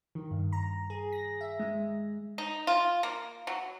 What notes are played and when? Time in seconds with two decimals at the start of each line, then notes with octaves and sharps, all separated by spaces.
0.15 D#3
0.31 G2
0.53 A#5
0.90 G#4
1.12 A#6
1.41 E5
1.60 G#3
2.38 D#4
2.67 F4
3.03 A#3
3.47 F#3